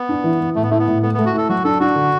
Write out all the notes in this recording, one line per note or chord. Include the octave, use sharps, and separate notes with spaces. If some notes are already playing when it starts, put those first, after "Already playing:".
Already playing: B3
D4
E3
E3
A2 A3
B3
A3 E4
B3
A2
A3 B3
A3 B3
F#4
E4 A4
F#3 F#4
D4 A4
D4 F#4
D3